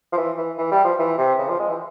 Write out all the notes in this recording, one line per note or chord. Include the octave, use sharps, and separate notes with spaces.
F3
E3
E3
E3
G3
F3
E3
C3
C#3
F3
G#3
E3